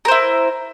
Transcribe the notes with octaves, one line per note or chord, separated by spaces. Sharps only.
E4 A#4 C5